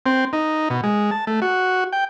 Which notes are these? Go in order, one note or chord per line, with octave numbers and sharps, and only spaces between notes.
C4
D#4
B2
G#3
A5
A3
F#4
G5